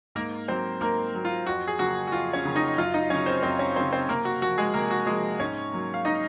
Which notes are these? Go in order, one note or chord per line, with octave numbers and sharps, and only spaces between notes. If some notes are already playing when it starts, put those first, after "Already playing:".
G#2 A#3 A#4
F#3 A#3 C4 C5
G#2 A#3 A#4
F#3 A#3
F4
F2 F#4
G#4
C#3 F#3 A#3 F#4
F#4
F2 F4
C#4 C#5
C#3 F#3 A#3
D#4 D#5
F#2 F4 F5
D#4 D#5
C#3 F#3 C#4 C#5
C4 C5
F#2 C4 C5
C#4 C#5
C#3 F#3 C4 C5
C4 C5
C3 A#3 A#4
F#4
F3 A#3 F#4
G#3 G#4
C3 A#3 A#4
F#4
F3 G#3 A#3 G#4
G#2 C#4 C#5
F#3 A#3
F5
D#4 D#5